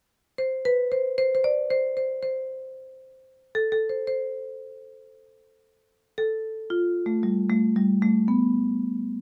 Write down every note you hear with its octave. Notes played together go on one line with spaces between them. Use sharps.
C5
B4
C5
C5
C5
D5
C5
C5
C5
A4
A4
C5
C5
A4
F4
A3
G3
A3
G3
A3
B3